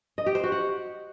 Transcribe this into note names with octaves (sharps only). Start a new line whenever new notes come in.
D#5
G4
C5
F#4
F#5